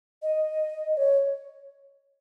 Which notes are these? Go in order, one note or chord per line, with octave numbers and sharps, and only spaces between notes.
D#5
C#5